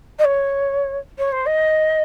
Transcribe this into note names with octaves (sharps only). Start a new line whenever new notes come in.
D#5
C#5
C#5
C5
D#5